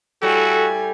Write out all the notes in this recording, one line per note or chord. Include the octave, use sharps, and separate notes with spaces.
A2 G3 F#4 A4 G#5